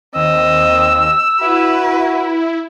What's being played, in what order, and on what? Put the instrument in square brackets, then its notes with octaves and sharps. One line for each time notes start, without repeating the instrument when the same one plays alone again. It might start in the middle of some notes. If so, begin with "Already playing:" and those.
[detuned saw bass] D#2 [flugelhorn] C4 [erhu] D#5 [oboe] E6
[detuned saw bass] E4 [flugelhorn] F#4 [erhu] B4